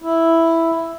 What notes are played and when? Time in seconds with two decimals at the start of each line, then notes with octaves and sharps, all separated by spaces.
0.02 E4